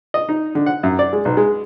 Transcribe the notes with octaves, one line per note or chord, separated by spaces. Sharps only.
D#5
D#4
D3
F#5
F#2
D5
G#3
B1
G#3